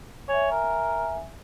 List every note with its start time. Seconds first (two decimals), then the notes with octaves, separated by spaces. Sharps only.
0.29 C#5 E5 G#5
0.51 A#4